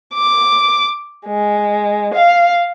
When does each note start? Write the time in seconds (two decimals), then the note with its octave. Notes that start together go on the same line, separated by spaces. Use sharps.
0.15 D6
1.27 G#3
2.14 F5